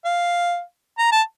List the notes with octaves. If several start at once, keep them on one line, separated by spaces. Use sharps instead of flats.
F5
A#5
A5